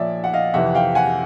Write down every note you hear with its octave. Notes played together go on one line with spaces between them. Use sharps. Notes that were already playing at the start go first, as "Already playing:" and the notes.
Already playing: A#2 F3 C#5 D5 E5
F#5
D#5 F5
F2 C3 E3 E5 F#5
F5 G5
F#5 G#5